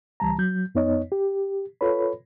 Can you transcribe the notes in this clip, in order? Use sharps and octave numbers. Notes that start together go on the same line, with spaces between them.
C#2 E3 G3 A5 A#5
F#3 G6
F2 B3 D#4 C#5 D#5
G4
F4 A4 B4 C#5 B5